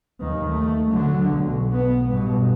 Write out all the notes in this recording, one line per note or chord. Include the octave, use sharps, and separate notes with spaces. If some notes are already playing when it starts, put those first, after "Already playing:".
D#2 D#3
A3
D3 F#3
B1
B3
G2 B2